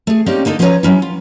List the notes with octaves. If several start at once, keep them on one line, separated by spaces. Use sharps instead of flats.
A3 G#4
A#3 C4 C#4 D#4 G4 D5
D3 A#3 D#4 A4
F3 C#4 G#4 B4 C#5 A#5
F#3 C#4 E4
F4